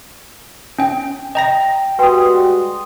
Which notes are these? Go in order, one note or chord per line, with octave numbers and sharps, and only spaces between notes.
C#4 G5
D#5 G5 A#5 A#6
G3 G#3 F#4 B4 G5 C6 D#6